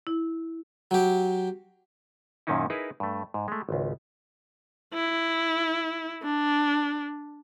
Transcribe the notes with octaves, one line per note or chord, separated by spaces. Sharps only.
E4
F#3 G4
F#2 A#2 D#3 C#4 D#4 E4
D#4 E4 G#4 A#4 B4
G2 A3
G#2
G#3 A3
G#1 C#2
E4
D4